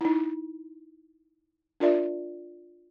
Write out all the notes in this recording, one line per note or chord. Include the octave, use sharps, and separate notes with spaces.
D#4 E4
D4 F4 A#4 D5 E5